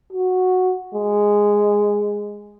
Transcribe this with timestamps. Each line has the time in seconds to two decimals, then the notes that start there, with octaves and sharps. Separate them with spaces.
0.13 F#4
0.95 G#3